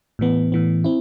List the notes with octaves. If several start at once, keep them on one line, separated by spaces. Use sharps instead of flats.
A2 E3 B3
A2 E3 B3
C4 E4